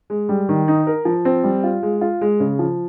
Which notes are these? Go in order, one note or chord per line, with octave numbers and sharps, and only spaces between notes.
G#3
G3
D#3
D#4
A#4
F3
C4
G3
F4
G#3
F4
G#3
C#3
F3